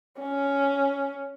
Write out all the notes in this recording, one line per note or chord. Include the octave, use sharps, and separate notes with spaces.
C#4